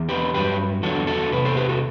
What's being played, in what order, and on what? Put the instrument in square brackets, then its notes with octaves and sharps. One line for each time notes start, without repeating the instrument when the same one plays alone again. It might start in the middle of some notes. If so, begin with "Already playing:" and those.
Already playing: [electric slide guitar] E2 E3
G4 B4
G2 F#3 G4 B4
E2 D3 F#3 F#4 A4
F#4 A4
E2 C3 B4
A4 C5
G4 B4
F#4 A4